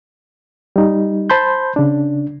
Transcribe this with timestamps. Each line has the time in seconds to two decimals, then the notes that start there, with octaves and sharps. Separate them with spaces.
0.76 G3 D#4
1.30 C5 A5 B5 C6 G6
1.76 C#3 D4